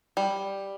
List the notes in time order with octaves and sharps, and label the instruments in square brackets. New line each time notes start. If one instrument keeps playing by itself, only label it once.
[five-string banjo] G3